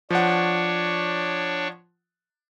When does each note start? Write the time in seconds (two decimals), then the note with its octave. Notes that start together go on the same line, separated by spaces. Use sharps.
0.10 F3 D4 C#5 F#5